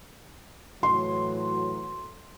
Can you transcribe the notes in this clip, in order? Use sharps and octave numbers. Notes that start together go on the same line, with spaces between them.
A2 E3 F#3 C6